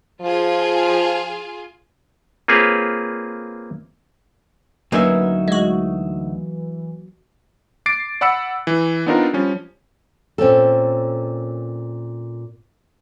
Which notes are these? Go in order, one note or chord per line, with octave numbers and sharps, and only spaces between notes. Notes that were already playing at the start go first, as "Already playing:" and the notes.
F3 F4 G#4
A#3 C4 F4 G#4 B4 C#5
D2 F#3 A#3 C#4 D#4 B4 E5
E3 G#3 F#4
D6 A6 C7 D7
D5 F#5 B5 E6 B6 C#7
E3
B3 C4 D4 D#4 F4 A#4
F3 G3 C#4
A#2 C4 C#4 A4